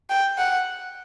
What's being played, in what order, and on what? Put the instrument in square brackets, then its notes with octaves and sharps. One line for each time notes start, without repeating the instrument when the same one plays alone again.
[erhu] G5
F#5